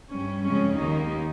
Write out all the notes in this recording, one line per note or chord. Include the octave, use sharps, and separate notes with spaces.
G2 G3 C#4
F2 C#3 G#3 C#4
D#2 D#3 A#3 D#4